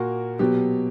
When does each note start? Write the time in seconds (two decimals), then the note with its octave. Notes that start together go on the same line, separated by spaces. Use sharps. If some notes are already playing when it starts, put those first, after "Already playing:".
Already playing: A#2 A#3 F#4 A#4
0.39 B2 F#3 B3 G4